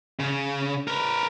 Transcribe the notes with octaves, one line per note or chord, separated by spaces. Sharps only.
C#3
A#4 B4